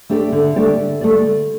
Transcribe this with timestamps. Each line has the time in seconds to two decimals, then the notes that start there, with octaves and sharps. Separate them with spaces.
0.09 A3 D4 G4 D5
0.32 D3
0.56 A3 D4 G4 D5
0.78 D3
1.01 A3 D4 G4 D5
1.25 D3